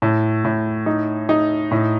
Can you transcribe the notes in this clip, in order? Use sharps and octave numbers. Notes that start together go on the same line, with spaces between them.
A2
A2
D#4
D#4
A2